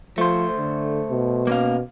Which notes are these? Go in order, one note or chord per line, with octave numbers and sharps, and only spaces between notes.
F3 A3 C5
D3
B2
A#3 C#4 F5